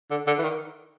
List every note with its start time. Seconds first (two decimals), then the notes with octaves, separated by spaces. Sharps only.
0.11 D3
0.27 D3
0.38 E3
0.43 D#3